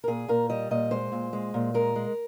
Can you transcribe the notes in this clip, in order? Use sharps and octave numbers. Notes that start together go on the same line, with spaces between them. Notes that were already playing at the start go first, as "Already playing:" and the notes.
A#4
A#2 G#4
A#2 A#4
G3 D#5
A#2 D#5
G#3 C5
A#2
G#3
A#2
G#3 A#4
G#3